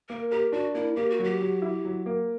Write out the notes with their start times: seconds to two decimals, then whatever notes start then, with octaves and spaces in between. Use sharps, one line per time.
0.09 A#3 A#4
0.31 G4 A#4
0.52 D4 F#4
0.75 A#3 E4
0.96 A#3 G4
1.10 F#4
1.19 F#3 G4
1.40 F#3
1.62 E4
1.85 F#3
2.06 A#3